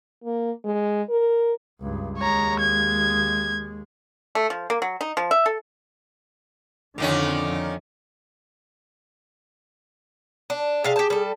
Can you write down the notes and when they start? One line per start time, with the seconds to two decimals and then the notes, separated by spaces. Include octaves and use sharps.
0.24 A#3
0.65 G#3
1.10 A#4
1.80 C#2 G2
2.18 D#2 G#3 C#5 A#5
2.60 G#6
4.35 A3
4.50 F3
4.70 A#3
4.82 F#3
5.01 D#4
5.17 F3
5.31 E5
5.46 A4
6.98 F2 A#2 D3 D#3 C#4
10.50 D4
10.84 C3 G#4 F5 A5
10.96 G4 A5
11.10 G3 A4